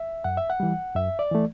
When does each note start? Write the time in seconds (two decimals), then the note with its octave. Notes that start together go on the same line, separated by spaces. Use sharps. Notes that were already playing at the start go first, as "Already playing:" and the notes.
Already playing: E5
0.24 F#2 F#5
0.37 E5
0.50 F#5
0.60 E3 G3
0.95 F#2 E5
1.19 D5
1.31 E3 A3